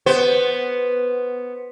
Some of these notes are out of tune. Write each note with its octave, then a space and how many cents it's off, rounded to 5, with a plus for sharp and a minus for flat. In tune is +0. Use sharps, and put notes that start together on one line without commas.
B3 +0 C5 +0